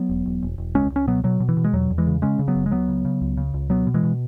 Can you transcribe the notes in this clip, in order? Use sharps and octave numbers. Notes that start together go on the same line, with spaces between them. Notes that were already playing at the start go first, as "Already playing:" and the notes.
Already playing: F#3 B3
E1
E1
E1
E1
C#2 G#3 C#4
C#2 C#4
B2 F#3 B3
B2 F#3
B2
E3
B2
G#3
E2 F#3
E2
E3 G#3
C#3
C#3 G#3 C#4
C#3
F#3 B3
F#1
G#3
C#2 F#3 B3
C#3
C#3
C#2
C#3
C#2
B2 F#3 B3
B2
E3 G#3
B2